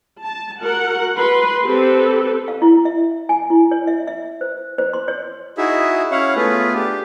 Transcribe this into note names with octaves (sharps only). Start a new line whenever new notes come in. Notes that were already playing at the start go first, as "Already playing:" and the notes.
A5
F#4 A#4 F#5
B4 C6
C4 G4 A4 B4
F5
E4
E5
G#5
E4
C#5
E5
E5
C5
C5
C6
C#5
D#4 E4 F#4 G#4 E5
C#4 E4 C#5 F5 F#5
A3 B3 F4 G#4 B4
D4 G4